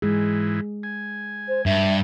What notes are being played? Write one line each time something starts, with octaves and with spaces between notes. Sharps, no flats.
G#2 E3 G#3 G#4
G#5
C5
G2 E5